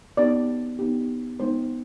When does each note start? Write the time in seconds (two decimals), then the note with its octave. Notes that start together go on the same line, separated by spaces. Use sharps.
0.17 B3 D#4 G4 D5
0.79 B3 D#4 G4
1.40 G#3 B3 D#4 C5